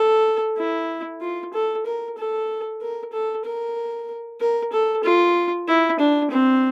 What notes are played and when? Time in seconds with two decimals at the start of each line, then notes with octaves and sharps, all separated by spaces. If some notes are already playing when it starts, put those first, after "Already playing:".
Already playing: A4
0.57 E4
1.21 F4
1.53 A4
1.86 A#4
2.18 A4
2.81 A#4
3.12 A4
3.45 A#4
4.41 A#4
4.73 A4
5.04 F4
5.68 E4
6.00 D4
6.31 C4